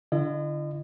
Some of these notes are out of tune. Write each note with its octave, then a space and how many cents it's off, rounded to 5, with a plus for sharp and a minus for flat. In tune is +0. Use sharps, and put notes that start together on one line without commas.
D3 +0 E4 +40 D#5 -30